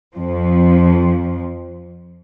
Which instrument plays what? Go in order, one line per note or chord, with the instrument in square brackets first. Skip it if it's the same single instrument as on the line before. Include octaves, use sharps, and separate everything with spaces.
[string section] F2 F3